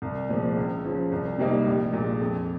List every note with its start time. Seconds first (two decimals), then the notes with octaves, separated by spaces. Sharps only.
0.02 C2
0.29 A#2 F3 G#3
0.56 C#2
0.85 C#3 F3
1.12 C2
1.38 C3 G3 A#3 D#4
1.66 A#1
1.93 A#2 G#3
2.20 F2